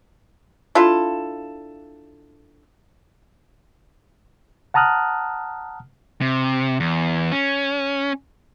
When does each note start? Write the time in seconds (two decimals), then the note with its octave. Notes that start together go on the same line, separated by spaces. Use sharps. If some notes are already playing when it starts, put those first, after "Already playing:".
0.75 D4 E4 F4 A4
4.74 F#5 A5 A#5 D#6 F6 F#6
6.21 C3
6.80 E2
7.32 C#4